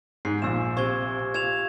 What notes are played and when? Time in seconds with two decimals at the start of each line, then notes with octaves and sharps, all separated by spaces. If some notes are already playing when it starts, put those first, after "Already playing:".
0.25 G#2 C7
0.42 A#1 A#2 E6 E7
0.77 C3 C#6 G#6 G7
1.34 F4 G#6 E7 F7